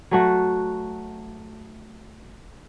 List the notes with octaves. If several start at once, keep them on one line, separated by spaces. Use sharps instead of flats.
F#3 A3 F#4